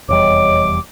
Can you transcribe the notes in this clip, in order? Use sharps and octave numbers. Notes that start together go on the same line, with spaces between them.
F1 E2 G3 C#5 D#5 D6